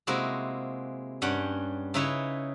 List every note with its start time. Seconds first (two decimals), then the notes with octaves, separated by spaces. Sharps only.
0.07 C3 G#3 A#3 E4 F#4 G#4
1.22 G2 G3 C#4 F#5 G5
1.94 C#3 D#4 E4 B4 C#5